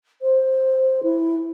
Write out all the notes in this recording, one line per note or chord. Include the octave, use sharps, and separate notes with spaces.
C5
E4